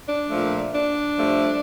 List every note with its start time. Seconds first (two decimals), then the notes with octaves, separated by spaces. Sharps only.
0.09 D4
0.30 A#2 F3 A3
0.74 D4
1.17 G2 F3 A3